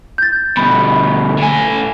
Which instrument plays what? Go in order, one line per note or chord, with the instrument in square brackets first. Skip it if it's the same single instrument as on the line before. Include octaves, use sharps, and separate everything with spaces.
[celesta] G6 A6
[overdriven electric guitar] D2 B2 [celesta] B5
[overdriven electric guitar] A2 G#5